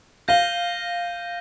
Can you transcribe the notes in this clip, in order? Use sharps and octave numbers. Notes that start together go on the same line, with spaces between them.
F5 G6 A#6 D#7 G7